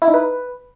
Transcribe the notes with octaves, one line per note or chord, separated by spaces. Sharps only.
E4
D#4
B4